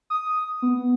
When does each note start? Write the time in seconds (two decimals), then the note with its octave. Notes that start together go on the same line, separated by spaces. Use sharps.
0.10 D#6
0.62 B3